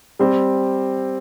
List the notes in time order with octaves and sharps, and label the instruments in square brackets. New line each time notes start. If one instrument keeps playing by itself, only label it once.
[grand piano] G3 C4 G4